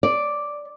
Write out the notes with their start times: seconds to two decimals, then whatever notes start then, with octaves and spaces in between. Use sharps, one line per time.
0.03 D5